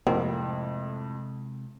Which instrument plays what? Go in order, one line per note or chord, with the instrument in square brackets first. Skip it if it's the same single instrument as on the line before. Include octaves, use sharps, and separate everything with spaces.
[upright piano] F2 A2 [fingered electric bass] C3 G#3 [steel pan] A#3 [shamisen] C4